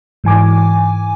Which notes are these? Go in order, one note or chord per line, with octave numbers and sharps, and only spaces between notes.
G#2 E3 G#5 D6